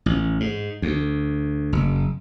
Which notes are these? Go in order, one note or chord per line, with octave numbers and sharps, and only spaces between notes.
A1
G#2
D2
F#1